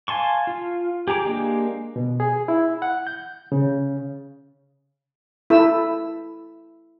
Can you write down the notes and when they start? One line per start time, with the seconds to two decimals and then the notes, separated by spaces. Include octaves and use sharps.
0.08 F5 G#5 A5 C6 C#6
0.47 F4
1.08 G4 G#4 A#5 D6
1.25 G#3 A#3 D4 G4
1.96 B2
2.20 G#4
2.48 E4
2.82 F#5
3.07 G6
3.52 C#3
5.50 E4 A4 E6